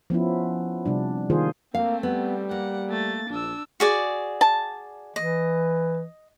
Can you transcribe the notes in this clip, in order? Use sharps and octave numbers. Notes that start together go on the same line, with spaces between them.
F3 B3 C#4 E4
C3 G3 D4
D#3 A#3 F4 G#4 C5
A3 A#3 C4 F5
G3 B3
A#3 F#5
A3 A6
A#1 D4 E6
F#4 G#4 D5
A5
E3 D#5